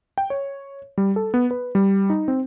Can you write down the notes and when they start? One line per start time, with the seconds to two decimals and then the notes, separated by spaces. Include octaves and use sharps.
0.18 G5
0.30 C#5
0.98 G3
1.16 A4
1.34 B3
1.51 B4
1.75 G3
2.10 D#4
2.28 C4